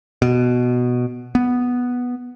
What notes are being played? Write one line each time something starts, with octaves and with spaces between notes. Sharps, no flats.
B2
B3